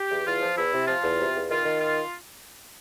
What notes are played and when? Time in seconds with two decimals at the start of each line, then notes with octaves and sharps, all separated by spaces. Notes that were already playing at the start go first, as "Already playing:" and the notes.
Already playing: G4
0.09 E2
0.24 E2 F4
0.40 F3
0.55 E2 E4
0.72 C3
0.87 F3 F4
1.02 E2
1.18 C3
1.33 E2
1.49 D#3 F4
1.65 D#3
1.80 F4